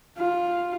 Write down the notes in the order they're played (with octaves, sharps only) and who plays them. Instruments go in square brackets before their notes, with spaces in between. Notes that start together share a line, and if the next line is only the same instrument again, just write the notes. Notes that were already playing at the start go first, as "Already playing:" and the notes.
[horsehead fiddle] F4